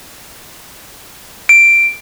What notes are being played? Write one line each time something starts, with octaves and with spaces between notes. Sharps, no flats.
D7